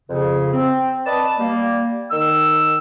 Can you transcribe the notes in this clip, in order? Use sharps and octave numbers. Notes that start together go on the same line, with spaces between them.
F2 C#3
C4
B4 D5 D#5 A5
G3 A#3
D#3 E6